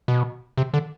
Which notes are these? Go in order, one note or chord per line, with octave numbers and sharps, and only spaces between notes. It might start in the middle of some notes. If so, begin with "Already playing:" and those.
B2
C3
D3